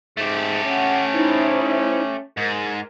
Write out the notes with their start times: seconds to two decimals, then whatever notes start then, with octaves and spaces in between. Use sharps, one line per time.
0.17 G#2 A3 G4
0.64 C#4 F#5
1.13 D#4 E4 C5
2.37 G#2 A#4